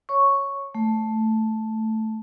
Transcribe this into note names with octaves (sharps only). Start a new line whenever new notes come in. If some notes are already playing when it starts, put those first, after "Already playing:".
C#5 C#6
A3